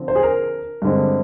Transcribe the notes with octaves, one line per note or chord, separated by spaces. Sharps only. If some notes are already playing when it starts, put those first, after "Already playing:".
Already playing: D3 F3 C4
C5
G#4
A#4
G2 D3 G#3 C4